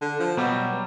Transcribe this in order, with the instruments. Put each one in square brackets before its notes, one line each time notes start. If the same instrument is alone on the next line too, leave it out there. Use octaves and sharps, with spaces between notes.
[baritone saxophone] D3
F3
[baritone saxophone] B2 [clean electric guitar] F#3 G3 [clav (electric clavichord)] B3